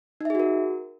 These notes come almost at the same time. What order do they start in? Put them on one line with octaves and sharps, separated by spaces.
D#4 E5 G#4 F#4 A#4